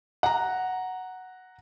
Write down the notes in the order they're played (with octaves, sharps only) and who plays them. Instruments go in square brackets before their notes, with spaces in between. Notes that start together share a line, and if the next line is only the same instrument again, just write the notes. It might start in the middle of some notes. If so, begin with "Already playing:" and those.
[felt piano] F#5 A#5